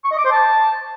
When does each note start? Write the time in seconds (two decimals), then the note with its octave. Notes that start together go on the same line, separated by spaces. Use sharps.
0.05 C#6
0.11 D#5
0.18 D6
0.25 C5
0.32 A5